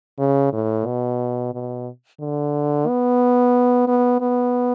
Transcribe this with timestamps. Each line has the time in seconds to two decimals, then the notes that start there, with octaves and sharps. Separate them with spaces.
0.19 C#3
0.53 A2
0.86 B2
1.53 B2
2.20 D3
2.87 B3
3.88 B3
4.21 B3